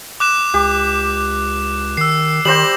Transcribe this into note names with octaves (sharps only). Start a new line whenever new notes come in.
D6 F#6 E7
C#2 G4
D#3 E6 C7
D#3 G3 C5 G5 A#6 E7 F#7